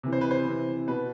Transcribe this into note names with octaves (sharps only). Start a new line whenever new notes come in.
C3 E3
C5
B4
C5
C3 E3
B2 B4